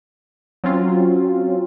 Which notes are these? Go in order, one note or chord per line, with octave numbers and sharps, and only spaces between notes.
F#3 C4 C#4 F4